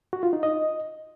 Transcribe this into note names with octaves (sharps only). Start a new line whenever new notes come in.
F#4
F4
D#4
D#5